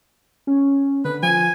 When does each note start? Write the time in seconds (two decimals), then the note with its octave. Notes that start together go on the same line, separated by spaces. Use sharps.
0.47 C#4
1.05 D3 B4
1.23 F3 G#5